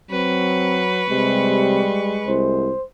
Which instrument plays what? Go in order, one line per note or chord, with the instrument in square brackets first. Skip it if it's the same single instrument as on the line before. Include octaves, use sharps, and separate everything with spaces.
[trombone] F#3 [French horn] C4 [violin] B4 C#6
[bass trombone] C3 [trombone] G3 [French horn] G#3
[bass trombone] C2 [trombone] C5